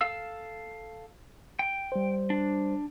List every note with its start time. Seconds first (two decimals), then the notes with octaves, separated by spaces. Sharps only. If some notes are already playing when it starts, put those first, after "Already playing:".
0.01 A4 F5 E6
1.59 G5
1.92 G3 C5
2.30 D4